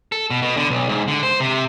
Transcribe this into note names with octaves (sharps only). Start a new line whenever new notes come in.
A4
B2
B2
D3
B1
G#2
D3
C5
C3